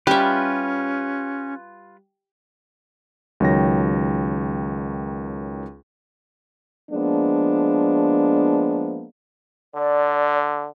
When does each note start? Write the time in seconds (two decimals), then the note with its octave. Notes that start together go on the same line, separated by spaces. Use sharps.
0.07 G3 C#4 F4 G4 B4 E5
3.40 C#2 D#3 F#3 C#5 G5 A#6
6.91 F3 G#3 A#3 B3 D4
9.75 D3 D5